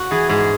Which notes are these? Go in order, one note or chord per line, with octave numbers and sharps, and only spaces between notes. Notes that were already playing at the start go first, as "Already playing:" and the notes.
Already playing: F#4
E3 G#4
G#2 G#4